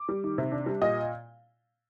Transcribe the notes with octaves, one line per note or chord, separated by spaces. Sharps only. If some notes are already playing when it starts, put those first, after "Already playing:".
Already playing: D6
G3
D#3
C3
D4
G3
A#2 D#5